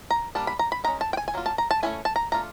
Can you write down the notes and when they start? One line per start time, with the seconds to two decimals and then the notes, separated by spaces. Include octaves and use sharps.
0.11 A#5
0.35 G3 A#3 D4 A5
0.47 B5
0.59 A#5
0.72 B5
0.84 D#3 G#3 C#4 A#5
1.01 A5
1.13 G5
1.17 G#5
1.28 G#5
1.34 F#3 A#3 F4
1.46 A5
1.58 A#5
1.71 A5
1.83 A3 C#4 E4 G#5
2.05 A5
2.16 A#5
2.32 A3 D4 F4 A#5